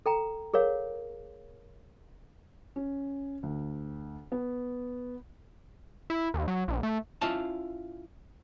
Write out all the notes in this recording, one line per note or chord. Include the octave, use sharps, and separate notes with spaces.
A4 G5 A#5
G#4 A#4 C#5 F5
C#4
D2
B3
E4
D#2
F#3
A#1
A3
C#4 E4 F4 D#5 F5 A5